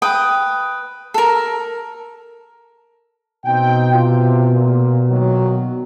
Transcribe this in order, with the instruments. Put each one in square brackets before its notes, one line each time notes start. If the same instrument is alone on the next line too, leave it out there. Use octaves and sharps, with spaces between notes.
[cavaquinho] B4 G5 D#6
A4 A#4
[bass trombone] B2 [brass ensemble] C4 D#4 G5
[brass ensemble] C3 F4
A#2
A#2 D#3 F#3